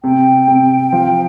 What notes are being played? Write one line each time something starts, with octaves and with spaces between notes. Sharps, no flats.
C3 G5
C3
F3